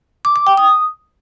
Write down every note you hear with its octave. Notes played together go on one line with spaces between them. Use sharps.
D6
D6
G5
D#6